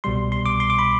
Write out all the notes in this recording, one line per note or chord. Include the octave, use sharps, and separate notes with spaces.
C2 B2 G3 C6
C6
D6
C6
D6
B5